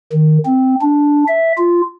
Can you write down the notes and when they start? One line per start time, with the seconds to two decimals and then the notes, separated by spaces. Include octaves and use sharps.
0.12 D#3
0.46 C4
0.81 D4
1.28 E5
1.58 F4